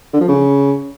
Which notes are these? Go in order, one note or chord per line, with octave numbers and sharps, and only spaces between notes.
D3
F3
C#3